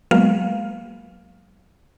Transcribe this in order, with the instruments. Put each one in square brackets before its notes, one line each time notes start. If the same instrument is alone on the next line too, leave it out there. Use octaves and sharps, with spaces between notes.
[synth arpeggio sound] F#3 G#3 A#3 B3 F5